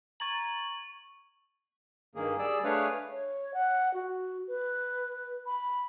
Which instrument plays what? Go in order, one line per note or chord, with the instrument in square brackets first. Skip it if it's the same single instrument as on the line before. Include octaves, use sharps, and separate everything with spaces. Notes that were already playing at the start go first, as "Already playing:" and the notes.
[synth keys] A#5 G#6 A6 [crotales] C#6 F#7
[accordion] G2 D#3 A#3 G#4
G3 G#4 D5 E6
A3 D4 G#4 B4 C#5 F5
[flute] C#5
F#5
F#4
B4
B5